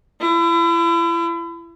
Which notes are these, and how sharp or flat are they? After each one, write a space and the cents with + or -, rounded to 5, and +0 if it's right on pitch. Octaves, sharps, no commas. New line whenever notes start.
E4 +35